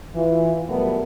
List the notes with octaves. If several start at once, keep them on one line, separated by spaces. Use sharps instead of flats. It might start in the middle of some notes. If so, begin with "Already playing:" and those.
E3 F4
B2 F#3 G3 A3 B3 A#4